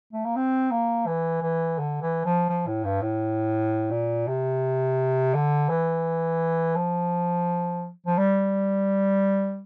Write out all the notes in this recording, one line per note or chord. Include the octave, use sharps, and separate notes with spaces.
A3
A#3
C4
A#3
E3
E3
D3
E3
F3
F3
A2
G2
A2
A#2
C3
D3
E3
F3
F3
G3